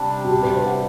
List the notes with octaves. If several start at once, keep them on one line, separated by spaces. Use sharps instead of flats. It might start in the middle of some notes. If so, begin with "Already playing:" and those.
Already playing: C3 G3 D4
F#4
G4
B4
C5
F#5